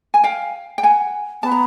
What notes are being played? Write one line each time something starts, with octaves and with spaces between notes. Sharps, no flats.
G#5
F5 G5
G5
F#5 G#5
B3 A5
A#5